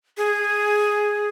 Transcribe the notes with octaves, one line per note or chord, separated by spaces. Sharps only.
G#4